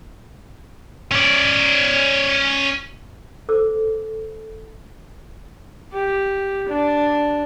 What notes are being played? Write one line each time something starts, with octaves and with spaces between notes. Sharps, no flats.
C#4 D5
A4 C5 D6 E6
G4
D4